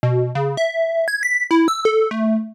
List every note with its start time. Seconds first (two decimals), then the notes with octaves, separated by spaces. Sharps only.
0.03 B2
0.35 C#3
0.57 E5
1.08 G#6
1.23 B6
1.51 E4
1.68 E6
1.85 A4
2.11 A3